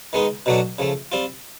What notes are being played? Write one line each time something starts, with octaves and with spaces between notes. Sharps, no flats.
D#3 G#3 B3 D#4
B2 F#3 A3 D4 F#4
C#3 F3 A3
G3 C4 F4